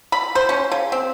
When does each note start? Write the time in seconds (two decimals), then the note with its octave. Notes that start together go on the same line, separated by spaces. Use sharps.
0.12 B5
0.35 C5
0.49 C#4
0.72 C#3
0.92 C4